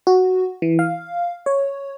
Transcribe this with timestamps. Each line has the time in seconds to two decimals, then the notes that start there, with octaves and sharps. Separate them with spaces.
0.07 F#4
0.62 E3
0.79 F5
1.46 C#5